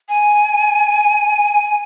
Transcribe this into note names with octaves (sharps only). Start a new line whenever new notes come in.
G#5
G#5